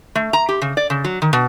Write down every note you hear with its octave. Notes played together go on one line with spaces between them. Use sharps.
A3
A#5
G4
C#3
D5
C#3
F#3
D#3
B2